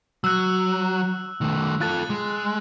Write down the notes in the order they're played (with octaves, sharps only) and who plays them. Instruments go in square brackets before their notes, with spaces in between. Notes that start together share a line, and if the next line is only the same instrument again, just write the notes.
[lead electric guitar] F#3 [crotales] E6 F#6
[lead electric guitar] D#3 A3
[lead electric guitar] F4 A4 [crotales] F#6 A6
[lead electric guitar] G#3